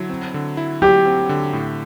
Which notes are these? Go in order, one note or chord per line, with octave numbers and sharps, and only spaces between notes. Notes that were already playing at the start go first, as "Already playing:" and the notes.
Already playing: D3 F#3 E4
C4
D3
E4
F#3 G4
C4
D3
A2